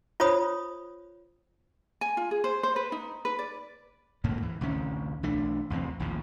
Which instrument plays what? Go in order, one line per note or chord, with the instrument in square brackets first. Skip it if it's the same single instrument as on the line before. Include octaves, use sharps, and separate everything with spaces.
[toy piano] F4 C5 C#5 B5 D#6
[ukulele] G#5
F4
G#4
C5
C5
B4
D#4
B4
D5
[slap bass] D2 G#2 A#3
E3
A1 D2 C3 C#4
B1 E3 A3 D4
A1 E2 C3 C4
A#1 D#2 A2 F3